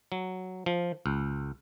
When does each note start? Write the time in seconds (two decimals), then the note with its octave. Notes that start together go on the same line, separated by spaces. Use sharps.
0.12 F#3
0.66 F3
1.06 C#2